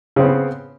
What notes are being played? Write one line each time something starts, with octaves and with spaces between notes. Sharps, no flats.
C#3 B3 C4